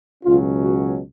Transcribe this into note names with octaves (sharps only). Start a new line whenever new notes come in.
C#2 B2 F#3 C#4 F4
F#4